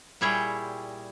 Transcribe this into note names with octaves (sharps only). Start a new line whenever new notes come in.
A#2 G3 E4 G#4 C#5 G5